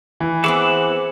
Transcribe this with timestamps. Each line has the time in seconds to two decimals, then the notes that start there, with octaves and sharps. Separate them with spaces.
0.20 E3
0.44 B3 C4 G#4 E5 F#5 D6